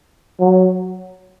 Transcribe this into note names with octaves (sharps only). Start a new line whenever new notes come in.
F#3